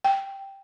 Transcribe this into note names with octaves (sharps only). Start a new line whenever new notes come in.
G5